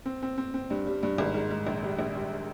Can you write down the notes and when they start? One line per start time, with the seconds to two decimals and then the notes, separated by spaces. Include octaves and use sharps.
0.06 C4
0.22 C4
0.38 C4
0.54 C4
0.70 G2
0.87 G3
1.03 G2
1.18 G#1
1.34 G#2
1.51 G#2
1.67 A#1
1.83 G3
1.99 A#1
2.15 G3